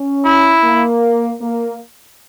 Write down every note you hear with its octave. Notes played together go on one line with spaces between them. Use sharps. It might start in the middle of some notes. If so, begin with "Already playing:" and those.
Already playing: C#4
E4
A#3
A#3